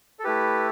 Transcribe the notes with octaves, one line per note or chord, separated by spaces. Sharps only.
A4
A3 E4 G4 B4